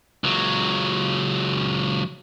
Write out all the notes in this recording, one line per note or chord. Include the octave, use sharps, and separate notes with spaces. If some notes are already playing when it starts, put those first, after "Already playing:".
C#2 F#3